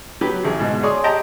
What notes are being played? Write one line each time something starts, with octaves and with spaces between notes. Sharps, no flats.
F#3 G4 B4
A1 G#4
G#2 B2
G#4 C#5 D5 C6 D#6
G4 D#5 G5 A5 A#5